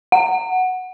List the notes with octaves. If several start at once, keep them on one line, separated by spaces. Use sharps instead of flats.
F#5